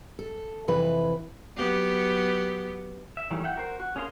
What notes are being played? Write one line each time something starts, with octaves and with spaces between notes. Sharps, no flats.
A4
F2 C3 E3 B4
F#3 B3 G4
E5
D#3 E3 F#3 G3 A3
E5 F#5 G5
F#4 A#4 C5
F#4
C#4 G#4 A#4 F5 C6